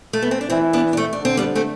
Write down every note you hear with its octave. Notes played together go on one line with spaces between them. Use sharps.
A3
B3
C4
D4
E3 C4 E4
B3 D4
D4
A3 C4
D4
D3 C4
G3 B3
A3 C4